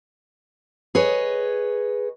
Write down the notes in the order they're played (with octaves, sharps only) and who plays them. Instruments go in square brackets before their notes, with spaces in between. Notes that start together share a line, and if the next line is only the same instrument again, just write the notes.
[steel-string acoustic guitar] G#4 B4 C#5 D#5